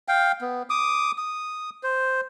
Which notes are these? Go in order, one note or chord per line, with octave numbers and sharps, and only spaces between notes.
F5 G5
B3
D6 D#6
D#6
C5